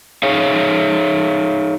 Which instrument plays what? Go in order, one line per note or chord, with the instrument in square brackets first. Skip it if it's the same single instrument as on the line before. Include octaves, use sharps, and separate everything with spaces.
[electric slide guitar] D#4 G#4 C#5 F5